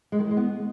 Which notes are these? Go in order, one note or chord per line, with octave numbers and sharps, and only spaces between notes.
G#3
D#3
E3
G#3
B3